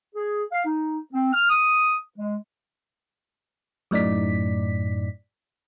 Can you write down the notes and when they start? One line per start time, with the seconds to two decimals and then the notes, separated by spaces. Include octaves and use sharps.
0.15 G#4
0.52 F5
0.65 D#4
1.13 C4
1.33 F6
1.50 D#6
2.18 G#3
3.91 F#2 A2 D#4 D5 B6